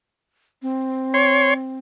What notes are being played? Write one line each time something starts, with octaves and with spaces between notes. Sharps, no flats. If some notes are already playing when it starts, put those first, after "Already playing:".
C4
C#5 C6